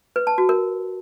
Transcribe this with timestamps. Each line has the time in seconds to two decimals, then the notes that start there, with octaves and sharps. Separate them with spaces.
0.16 B4
0.27 A5
0.38 F#4
0.49 A#4